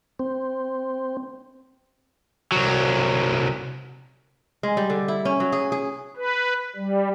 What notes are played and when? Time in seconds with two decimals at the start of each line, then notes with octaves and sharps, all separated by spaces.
0.19 C4
2.52 C2 F#3
4.63 G#3
4.77 G3
4.90 D3
5.08 E4
5.25 C#4
5.40 F#3
5.52 G#4
5.72 G#4
6.16 B4
6.76 G3